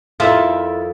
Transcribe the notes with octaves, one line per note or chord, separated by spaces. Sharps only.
F2 D#3 E4 F4 A4 E5